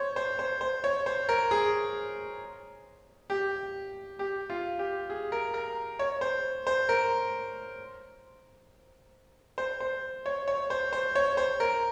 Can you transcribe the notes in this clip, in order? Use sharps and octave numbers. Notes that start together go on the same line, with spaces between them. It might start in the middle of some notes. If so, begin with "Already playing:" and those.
Already playing: C5 C#5
C5
C5
C5
C#5
C5
A#4
G#4
G4
G4
F4
G4
G#4
A#4
A#4
C#5
C5
C5
A#4
C5
C5
C#5
C#5
C5
C5
C#5
C5
A#4